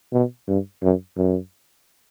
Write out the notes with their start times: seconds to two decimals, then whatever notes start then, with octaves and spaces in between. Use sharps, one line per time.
0.13 B2
0.48 G2
0.82 F#2
1.17 F#2